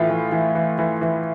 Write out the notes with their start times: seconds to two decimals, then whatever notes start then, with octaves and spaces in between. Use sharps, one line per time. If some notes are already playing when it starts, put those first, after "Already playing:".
Already playing: A2 E3 F4
0.10 E3
0.32 E3
0.55 E3
0.79 E3
1.01 E3